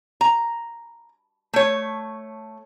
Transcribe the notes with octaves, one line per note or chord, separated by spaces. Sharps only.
A#5
A3 C#5